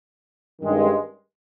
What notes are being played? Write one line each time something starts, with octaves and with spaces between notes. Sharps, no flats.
G2 D#3 G#3 C#4